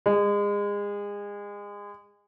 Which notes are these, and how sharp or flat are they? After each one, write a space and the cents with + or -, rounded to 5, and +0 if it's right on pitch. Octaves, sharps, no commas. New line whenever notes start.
G#3 -30